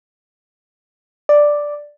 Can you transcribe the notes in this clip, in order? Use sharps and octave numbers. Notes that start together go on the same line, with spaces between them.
D5